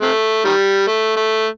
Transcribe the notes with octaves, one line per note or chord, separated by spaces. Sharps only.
C3 A3
D#3 G3
A3
A3